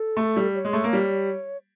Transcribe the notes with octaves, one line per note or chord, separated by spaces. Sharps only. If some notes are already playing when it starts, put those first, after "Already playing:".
Already playing: A4
A3
G3
C#5
G#3
A3
A#3
G3